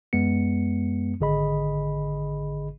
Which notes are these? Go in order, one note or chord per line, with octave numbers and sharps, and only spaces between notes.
F#2 G#3 B3 C#7
G#1 D3 G#4 D#5 B5